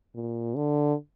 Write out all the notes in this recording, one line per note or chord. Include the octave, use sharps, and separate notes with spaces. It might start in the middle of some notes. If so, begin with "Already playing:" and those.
A#2
D3